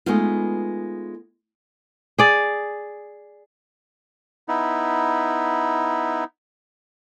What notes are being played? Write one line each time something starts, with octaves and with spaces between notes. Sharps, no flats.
G#3 A3 B3 D#4 F4
G#4 D5
B3 D#4 E4